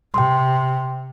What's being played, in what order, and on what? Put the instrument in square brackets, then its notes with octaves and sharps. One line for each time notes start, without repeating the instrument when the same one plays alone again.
[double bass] C3 [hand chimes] G5 C6